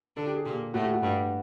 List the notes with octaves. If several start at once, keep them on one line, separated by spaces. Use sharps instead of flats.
D3 D4 A4
G4
G#4
A#2 A#3 G4
A2 A3 F#4
G4
F#4
G2 G3